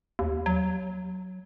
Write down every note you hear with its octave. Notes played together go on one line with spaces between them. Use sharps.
D#2
F#3